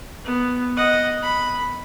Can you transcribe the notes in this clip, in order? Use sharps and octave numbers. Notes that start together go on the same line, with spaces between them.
B3
D#5 F#5
B5